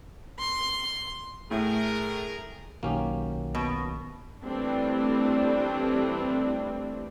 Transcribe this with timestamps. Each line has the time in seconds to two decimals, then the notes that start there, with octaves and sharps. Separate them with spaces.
0.39 C6
1.51 A2 A3 G#4 A#4
2.83 B1 D#3 A#3 C#4 F#4 G4
3.55 B2
4.44 E3 G3 A3 C4 D4